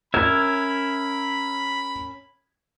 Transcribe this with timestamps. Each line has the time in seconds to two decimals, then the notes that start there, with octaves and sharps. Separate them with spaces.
0.14 C#4 A#4 E5 B5 G#6